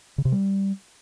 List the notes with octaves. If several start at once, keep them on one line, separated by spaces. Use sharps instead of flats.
C#3
C3
G3